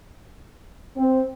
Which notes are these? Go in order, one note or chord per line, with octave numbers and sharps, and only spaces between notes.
C4